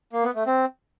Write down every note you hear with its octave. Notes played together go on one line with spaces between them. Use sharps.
A#3
B3
A3
C4